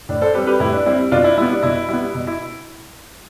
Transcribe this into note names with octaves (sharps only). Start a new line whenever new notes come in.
A2 D4
A4 C5
G3 C4 G4 B4
G4 B4
A2 E4
D4
G3 C4 E4
B2 D4 F4
E4
G3 B3 E4
D4
B2 E4
G3 B3 E4
B2
E4